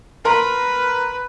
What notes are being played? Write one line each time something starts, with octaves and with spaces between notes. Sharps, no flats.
A#4 B4 A#5 C6